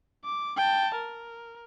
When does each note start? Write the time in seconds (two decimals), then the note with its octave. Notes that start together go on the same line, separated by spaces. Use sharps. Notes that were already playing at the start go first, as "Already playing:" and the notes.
0.24 D6
0.57 G5 A5
0.96 A#4